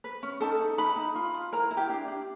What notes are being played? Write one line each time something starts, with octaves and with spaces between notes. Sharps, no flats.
B4
C#4
D#4 A4 A5
D#4
D#4 B4 B5
D#4
F4
F4
E4 A#4 A#5
E4
G4 G5
D4
D4